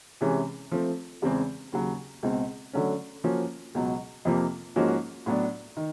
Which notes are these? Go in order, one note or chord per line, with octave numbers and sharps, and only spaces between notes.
C3 E3 G#3 C#4
F3 A3 C4
E2 C#3 E3 G#3 C4
D#2 C#3 F#3
C#2 B2 G#3 C4
D3 F#3 A3 C#4
F3 A#3 C#4 F#4
C#2 B2 F#3
F2 C3 F3 A#3
G#2 F3 A#3 C#4 F#4
A2 F#3 B3 D4
D#3